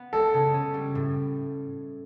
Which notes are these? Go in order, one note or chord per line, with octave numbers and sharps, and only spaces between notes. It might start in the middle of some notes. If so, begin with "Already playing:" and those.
Already playing: B3
G#3 A4
C#3
C#4
G3
A2